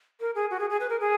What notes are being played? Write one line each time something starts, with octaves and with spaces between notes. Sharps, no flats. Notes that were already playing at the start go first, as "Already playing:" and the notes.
A#4
G#4
F#4
G#4
G#4
B4
A#4
G#4